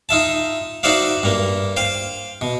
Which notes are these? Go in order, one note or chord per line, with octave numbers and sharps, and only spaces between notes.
D#4 F4 E5 A5
D#4 F#4 C5 D5 E5 F5
G2 A#3
C5 F5 G5
B2